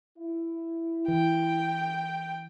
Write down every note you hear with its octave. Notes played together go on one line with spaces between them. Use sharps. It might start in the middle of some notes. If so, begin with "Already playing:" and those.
E4
E3 G5